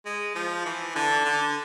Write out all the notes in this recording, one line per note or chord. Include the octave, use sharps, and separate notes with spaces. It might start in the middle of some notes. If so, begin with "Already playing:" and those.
G#3
F3
E3
D3
D3